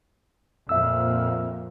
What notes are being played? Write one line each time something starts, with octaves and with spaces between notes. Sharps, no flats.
F2 A#2 E5 E6